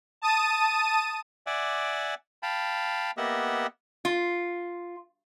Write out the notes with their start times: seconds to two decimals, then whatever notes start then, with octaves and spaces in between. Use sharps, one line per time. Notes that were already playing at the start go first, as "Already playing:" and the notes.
0.22 A5 D#6 D#7
1.47 D5 E5 F#5 G#5 D6
2.43 F5 G5 A5 B5
3.17 A#3 B3 G4 D#5 E5 F#5
4.05 F4